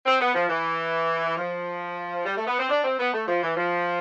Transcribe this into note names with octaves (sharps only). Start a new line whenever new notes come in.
C4
B3
F3
E3
F3
G3
A3
B3
C4
D4
C4
B3
A3
F3
E3
F3